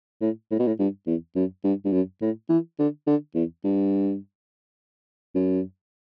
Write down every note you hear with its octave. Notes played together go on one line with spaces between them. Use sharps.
A2
A2
B2
A2
G2
E2
F#2
G2
G2
F#2
A2
E3
D3
D3
E2
G2
F#2